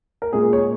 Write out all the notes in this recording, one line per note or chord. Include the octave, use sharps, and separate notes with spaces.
A#4
A#2 G#3 G#4
C#5